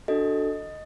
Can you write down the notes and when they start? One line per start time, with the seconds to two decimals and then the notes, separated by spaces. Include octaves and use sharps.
0.08 D4 F#4 A4 D#5